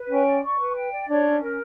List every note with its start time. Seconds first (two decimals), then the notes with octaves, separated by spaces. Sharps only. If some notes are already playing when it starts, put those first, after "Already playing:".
Already playing: B4
0.10 C#4 G5
0.26 D5
0.43 C#6
0.59 B4
0.75 G5
0.92 D5
1.09 D4 C#5
1.25 C#4
1.40 A#4